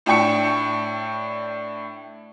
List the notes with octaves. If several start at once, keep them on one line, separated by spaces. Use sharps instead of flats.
A2 D4 E4 G5 C#6 C#7